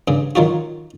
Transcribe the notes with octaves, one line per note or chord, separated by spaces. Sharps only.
G2 C#3
D#3 F#3 F4 F#4